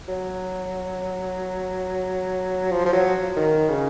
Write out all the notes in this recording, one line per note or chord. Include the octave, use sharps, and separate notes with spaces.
F#3
F3
F3
F#3
D#3
C#3